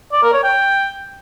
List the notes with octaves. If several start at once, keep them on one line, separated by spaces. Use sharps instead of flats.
D5
A#4
C#5
G5